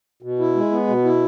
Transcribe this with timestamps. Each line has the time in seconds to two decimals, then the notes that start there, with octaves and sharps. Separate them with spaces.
0.22 B2
0.39 E4
0.55 G#3
0.72 B3
0.88 B2
1.04 E4